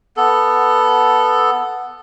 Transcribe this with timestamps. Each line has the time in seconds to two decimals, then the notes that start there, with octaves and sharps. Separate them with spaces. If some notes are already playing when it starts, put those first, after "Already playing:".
0.17 B3 A4